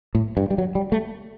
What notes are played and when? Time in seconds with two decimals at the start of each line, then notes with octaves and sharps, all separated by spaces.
0.15 A2
0.37 G2
0.51 G3
0.58 F#3
0.75 G3
0.92 A3